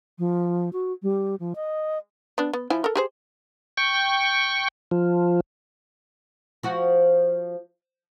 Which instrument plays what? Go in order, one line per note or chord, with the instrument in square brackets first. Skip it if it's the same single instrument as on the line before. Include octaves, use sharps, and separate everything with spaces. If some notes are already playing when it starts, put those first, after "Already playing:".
[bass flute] F3
F#4
G3
F3
D#5
[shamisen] B3 D4
B3
F3 E4 G#5
A4 A#4
G4 G#4 C5
[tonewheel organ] G5 C#6
F3
[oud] F3 F#4